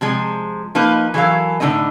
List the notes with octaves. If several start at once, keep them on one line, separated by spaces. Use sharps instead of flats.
C3 F3 G#3
F3 A#3 D#4 B4
E3 F#3 A4 A#4 F5
A2 D3 C4 D#4 D#5